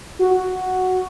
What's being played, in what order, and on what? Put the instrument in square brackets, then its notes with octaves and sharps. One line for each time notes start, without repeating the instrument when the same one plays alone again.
[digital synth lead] F#4